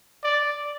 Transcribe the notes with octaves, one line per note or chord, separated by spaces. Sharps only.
D5